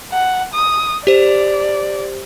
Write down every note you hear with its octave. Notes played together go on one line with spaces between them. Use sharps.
F#5
D#6
G4 C5 D5